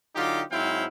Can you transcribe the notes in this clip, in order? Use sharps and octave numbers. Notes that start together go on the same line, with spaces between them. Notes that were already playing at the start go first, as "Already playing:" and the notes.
D3 F#3 D#4 F4 G4
G#2 F#3 C4 E4 F5 G5